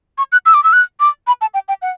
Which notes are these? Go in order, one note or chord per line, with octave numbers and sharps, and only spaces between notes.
C#6
F#6
E6
D6
E6
F#6
D6
B5
A5
G5
G5
F#5